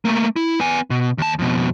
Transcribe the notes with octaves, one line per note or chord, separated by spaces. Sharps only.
A3 A#3
E4
B3 G#5
B2
D#2 A5
F2 B2